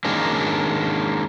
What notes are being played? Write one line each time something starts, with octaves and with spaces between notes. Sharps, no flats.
D#3 G#3 A#3 C#4 D4